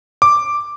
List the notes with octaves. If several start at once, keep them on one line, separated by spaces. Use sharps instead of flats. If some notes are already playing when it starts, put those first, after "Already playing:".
D6